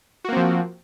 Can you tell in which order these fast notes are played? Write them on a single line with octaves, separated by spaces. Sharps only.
F#4 A#3 C4 F3